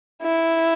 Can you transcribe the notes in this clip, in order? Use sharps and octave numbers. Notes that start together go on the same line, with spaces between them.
E4